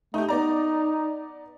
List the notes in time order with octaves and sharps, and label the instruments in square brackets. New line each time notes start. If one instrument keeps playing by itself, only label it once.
[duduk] A3 [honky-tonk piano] D#4 G4
[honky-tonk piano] B3 D5 A#5 [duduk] D#4